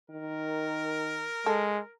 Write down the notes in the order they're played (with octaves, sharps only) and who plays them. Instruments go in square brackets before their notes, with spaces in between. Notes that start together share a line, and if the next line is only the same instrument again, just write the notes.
[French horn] D#3 [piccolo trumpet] A#4
[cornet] G#3 [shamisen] A4